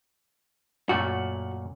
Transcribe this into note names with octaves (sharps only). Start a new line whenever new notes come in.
F#2 A#2 A3 F#4